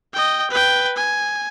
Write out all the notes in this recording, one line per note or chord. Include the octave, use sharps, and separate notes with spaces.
D#5 G5
B4 G5
G#5